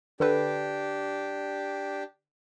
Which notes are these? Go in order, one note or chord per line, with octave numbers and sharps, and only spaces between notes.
D3 D4 G4 A4 B4